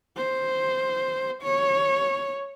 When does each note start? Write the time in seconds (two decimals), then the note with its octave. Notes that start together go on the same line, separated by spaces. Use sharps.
0.17 C5
1.43 C#5